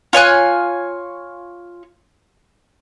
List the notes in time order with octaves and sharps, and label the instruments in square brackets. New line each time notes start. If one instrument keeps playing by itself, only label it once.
[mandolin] F4 C#5 G#5 F#6